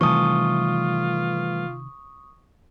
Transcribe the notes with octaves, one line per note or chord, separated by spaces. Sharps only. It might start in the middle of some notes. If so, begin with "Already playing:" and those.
C3 D#3 E3 G3 A3 F4 C#6 D#6